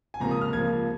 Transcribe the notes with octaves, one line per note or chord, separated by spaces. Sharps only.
G#5
C#2 C3 F3 A#3 A#5
D#6
F6
C#2 C3 F3 A#3 G#6